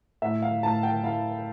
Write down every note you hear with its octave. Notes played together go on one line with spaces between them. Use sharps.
A2 E5
F5
A2 A5
G5
E4 F5